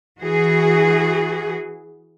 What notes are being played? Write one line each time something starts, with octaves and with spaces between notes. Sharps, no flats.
E3 F#4 G#4